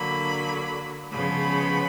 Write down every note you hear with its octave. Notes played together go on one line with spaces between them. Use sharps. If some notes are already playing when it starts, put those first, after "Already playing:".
Already playing: D3 F#3 A#3 B5
C#3 F3 G#3 B3 B5